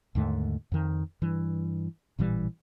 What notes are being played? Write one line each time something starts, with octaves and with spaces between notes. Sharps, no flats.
D#2 G#2 D3 A3
F2 D#3
G2 E3
A1 A#2 E3 G3